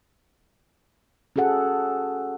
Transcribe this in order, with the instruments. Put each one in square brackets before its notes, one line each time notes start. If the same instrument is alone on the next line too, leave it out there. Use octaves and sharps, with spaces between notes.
[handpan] C#4 F#4 G#4 A4 F#5